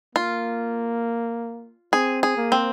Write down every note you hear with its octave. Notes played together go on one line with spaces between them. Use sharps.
A#3 F4
C4 G#4
G#4
A#3
C4